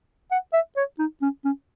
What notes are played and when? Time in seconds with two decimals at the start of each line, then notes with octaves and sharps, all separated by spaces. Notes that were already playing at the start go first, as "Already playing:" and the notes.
0.31 F#5
0.53 E5
0.77 C#5
0.99 D#4
1.22 C#4
1.45 C#4